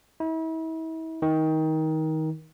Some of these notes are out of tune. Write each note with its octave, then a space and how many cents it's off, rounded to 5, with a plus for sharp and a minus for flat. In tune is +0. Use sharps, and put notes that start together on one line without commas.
E4 -40
D#3 +20